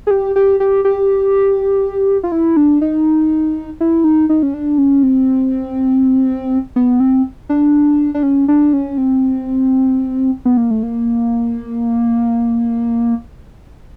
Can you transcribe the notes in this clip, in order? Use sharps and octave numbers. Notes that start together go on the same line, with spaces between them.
G#4
G4
G4
G4
G4
F4
E4
D4
D#4
E4
D#4
D#4
C#4
D4
C#4
C4
B3
C4
D4
D4
C#4
D4
C#4
C4
B3
A#3
A3
A#3